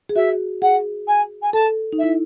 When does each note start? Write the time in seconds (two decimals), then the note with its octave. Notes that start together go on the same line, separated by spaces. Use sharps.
0.09 G#4
0.16 F#4 E5
0.62 G#4 F#5
1.08 G#5
1.42 G#5
1.53 A4 A5
1.93 D#4
1.99 E4 E5